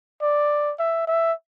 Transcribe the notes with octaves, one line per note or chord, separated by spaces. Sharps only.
D5
E5
E5